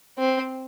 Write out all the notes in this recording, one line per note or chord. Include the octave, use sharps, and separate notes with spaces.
C4